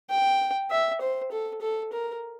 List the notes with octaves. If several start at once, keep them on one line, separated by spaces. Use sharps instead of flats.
G5
E5
C5
A4
A4
A#4